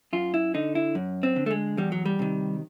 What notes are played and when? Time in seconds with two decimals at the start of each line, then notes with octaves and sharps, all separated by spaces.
0.13 F#2 F4
0.34 E4
0.54 D3 D#4
0.75 E4
0.95 F#2
1.23 C4
1.36 D3
1.46 A3
1.51 G#3
1.77 E2 G3
1.92 F#3
2.05 G3
2.19 C3 D#3